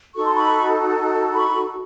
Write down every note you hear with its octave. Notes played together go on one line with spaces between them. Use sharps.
D#4 F#4 A4 C#6
C6
B5 C#6
B5 C#6